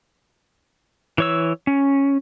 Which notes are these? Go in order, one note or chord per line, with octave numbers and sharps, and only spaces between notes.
E3 C#5 E6
C#4